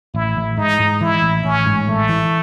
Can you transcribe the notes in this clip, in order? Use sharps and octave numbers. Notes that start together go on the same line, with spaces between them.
A1 E4
A1
G#2 D#4
G#2
E3 E4
A1
A1 C#4
G#2
A1 A3
E3